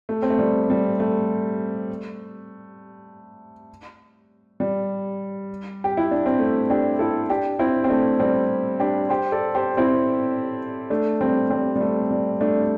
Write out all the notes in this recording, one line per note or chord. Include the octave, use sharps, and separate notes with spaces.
A3
C4
A3
G3
G3
A3
G3
G4
E4
D4
C4
A3
D4 G4
E4 A4
D4 G4
C4 E4
C4
A3 D4
G3 C4
D4 G4
G4 C5
A4 D5
G4 C5
C4 E4
A3 D4
G3 C4
G3 C4
G3
A3
G3
A3 D4